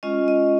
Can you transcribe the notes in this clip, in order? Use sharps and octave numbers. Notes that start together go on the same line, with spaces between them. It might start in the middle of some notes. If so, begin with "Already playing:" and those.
G#3 C#4 F4 D#5
D#5